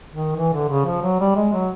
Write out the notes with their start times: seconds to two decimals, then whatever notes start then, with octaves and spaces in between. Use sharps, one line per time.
0.11 D#3
0.36 E3
0.53 D3
0.69 C#3
0.85 F3
1.02 F#3
1.20 G3
1.35 G#3
1.53 F#3